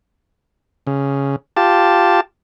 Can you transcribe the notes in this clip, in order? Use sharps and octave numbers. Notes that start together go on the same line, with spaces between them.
C#3
F4 G4 A5